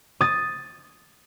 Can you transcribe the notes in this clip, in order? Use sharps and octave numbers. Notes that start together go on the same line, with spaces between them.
D#6 A6